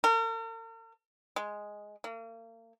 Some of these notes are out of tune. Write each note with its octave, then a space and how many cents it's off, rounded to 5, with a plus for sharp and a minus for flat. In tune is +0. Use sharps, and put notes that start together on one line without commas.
A#4 -45
G#3 +0
A#3 -40